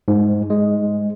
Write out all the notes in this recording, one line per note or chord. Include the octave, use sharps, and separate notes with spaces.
G#2
G#3